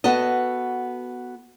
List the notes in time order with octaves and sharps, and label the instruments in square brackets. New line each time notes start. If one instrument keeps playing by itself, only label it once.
[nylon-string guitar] B3 F#4 A4 D#5